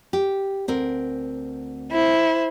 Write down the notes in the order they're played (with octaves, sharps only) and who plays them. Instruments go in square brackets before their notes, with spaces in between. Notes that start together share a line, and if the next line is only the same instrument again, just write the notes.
[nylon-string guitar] G4
D2 C4 A#4
[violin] E4 C5